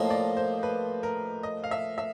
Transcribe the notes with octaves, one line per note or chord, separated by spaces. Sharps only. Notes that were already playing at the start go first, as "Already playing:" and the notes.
Already playing: A2 F3 A#3 D#5
D5
C5
B4
A#4
D#5
F5
E5
E5